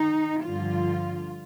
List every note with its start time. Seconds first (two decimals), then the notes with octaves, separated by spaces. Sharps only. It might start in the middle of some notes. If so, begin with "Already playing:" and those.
Already playing: D#3 D#4
0.43 G2 D3 F3 F4